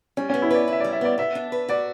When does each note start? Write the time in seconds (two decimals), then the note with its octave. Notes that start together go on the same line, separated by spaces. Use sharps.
0.17 G3 C#4
0.30 C#4
0.34 B3
0.42 E4
0.51 B4 D5
0.68 E4 E5
0.80 D5
0.84 G3
0.93 E5
1.01 B3 D5
1.18 B3 E5
1.35 D4
1.52 B4
1.69 F#4 D5